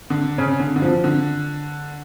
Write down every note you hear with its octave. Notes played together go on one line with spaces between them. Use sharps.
D3
C#3
D3
D3
F3
D3